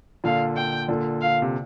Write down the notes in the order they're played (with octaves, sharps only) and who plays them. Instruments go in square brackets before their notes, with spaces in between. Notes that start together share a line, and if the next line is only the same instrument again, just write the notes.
[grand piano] A#2 D3 [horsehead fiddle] F5
[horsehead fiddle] G5
[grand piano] A#2 D3
[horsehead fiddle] F5
[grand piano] C3